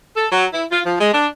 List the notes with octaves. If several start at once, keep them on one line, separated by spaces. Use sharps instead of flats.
A4
F#3
E4
F4
F3
G#3
D4